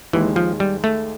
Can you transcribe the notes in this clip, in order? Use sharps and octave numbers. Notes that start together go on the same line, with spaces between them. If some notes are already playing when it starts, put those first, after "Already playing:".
D#2 D#3 E3 G#3
F3
G3
A3